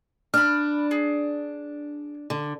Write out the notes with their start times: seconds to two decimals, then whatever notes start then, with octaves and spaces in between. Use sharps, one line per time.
0.34 D4 B5 F6
0.91 G#4
2.30 D3